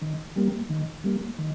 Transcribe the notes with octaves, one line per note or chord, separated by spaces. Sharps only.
D#3
G3 A#3
D#3
G3 A#3
D#3